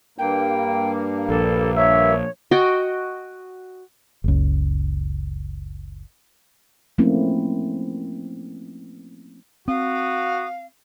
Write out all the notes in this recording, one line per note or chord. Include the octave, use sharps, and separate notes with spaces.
G2 A#3 G5
A#1 A4
C#5 E5
F#4 D#5 G5
F#1 C#2
F3 A3 A#3 C4 C#4 E4
C4 F#4 F5 D#6